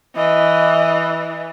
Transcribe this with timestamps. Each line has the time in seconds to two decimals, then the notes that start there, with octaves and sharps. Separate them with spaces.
0.16 E3 D#5